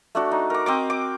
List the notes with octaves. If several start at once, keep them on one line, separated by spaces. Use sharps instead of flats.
A3 D4 F#4
D#4
A#4 D6
C4 D#5 D6
D6